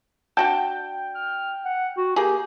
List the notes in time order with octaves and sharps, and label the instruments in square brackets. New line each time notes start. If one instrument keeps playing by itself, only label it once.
[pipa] D4 F#4 A5 [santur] G5
[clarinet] F6
F#5
F#4
[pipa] A#3 G#4 [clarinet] G4